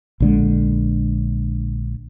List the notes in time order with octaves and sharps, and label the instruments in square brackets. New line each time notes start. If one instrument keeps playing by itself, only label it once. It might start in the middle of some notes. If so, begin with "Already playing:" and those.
[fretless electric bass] A#1 D3 G#3